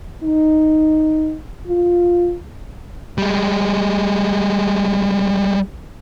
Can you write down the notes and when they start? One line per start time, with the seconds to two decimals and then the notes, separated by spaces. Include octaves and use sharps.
0.23 D#4
1.68 F4
3.18 G3 G#3